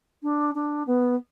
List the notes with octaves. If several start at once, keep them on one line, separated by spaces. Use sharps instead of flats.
D4
D4
B3